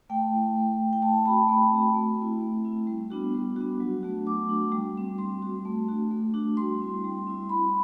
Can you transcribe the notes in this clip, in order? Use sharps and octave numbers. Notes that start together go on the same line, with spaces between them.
A3 G5
E4
A3
E4
G5
A3 A5
C4 F#4 B5
A3 B5
C4 F#4
A3
C4 E4
A3
C4 E4
G3
B3 D4 F#4
G3
B3 D4 F#4
F#3
A3 D4 F#4
F#3 D6
A3 D4 F#4
G3
C4 F#4
G3 C6
C4 F#4
A3
D4 F#4
A3
D4 F#4
G3 C6
C4 E4
G3
C4 E4
G3 B5